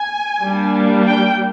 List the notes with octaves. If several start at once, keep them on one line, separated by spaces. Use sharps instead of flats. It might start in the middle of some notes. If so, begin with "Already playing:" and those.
Already playing: G#5
G3 A#3 D4
G5